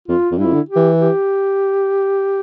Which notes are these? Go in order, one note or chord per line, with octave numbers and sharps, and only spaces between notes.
F2 F4
F2
G2 E4
F2
D3
G4
E3
G4